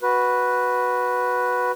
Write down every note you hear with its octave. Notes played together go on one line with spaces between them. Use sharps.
F#4 B4